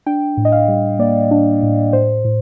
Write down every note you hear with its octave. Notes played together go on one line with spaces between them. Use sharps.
D4 G5
A2
D#5
F5
G3
A#3 D5
D4
A2
A2 C5
A2